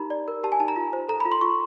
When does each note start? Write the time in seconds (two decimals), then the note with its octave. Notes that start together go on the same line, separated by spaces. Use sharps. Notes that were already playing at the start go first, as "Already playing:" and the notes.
Already playing: D#4 G4 A#4 A#5 B5
0.10 D5
0.28 A#4
0.43 G4 A5
0.52 G#5
0.60 D#4 A5
0.68 A#5
0.76 F4
0.93 C5
1.09 A4 A#5
1.20 B5
1.25 F4
1.32 C6
1.41 F4 C#6